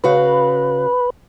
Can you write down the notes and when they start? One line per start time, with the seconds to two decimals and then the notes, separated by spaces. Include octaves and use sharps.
0.04 C#3 F#4 B4 F5